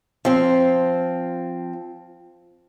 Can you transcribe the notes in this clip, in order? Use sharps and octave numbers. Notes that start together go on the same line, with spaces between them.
F3 C4